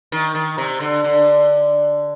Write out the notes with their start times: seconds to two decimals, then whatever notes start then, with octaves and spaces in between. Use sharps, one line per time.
0.12 D#3
0.35 D#3
0.58 C3
0.80 D3
1.04 D3